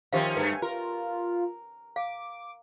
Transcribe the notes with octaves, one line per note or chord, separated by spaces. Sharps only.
D#3 F3 C#4 G4 C5 E5 F5
G2 A3 B4 G#5
F4 A#4
F5 D6